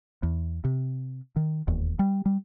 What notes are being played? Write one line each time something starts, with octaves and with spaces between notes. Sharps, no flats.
E2
C3
D#3
E1 D#2
G3
G3